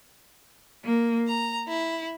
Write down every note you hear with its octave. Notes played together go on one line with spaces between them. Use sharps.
A#3
A#5
E4